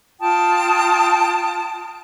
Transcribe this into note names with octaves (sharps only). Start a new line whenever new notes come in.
F4 G5 A5 D#6